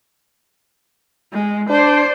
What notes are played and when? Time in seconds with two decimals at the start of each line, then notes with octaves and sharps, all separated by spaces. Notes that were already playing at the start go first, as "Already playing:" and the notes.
1.33 G#3
1.70 D4 C5 D5